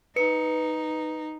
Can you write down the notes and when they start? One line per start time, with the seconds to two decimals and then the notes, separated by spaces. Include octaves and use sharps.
0.16 D#4 B4 C#7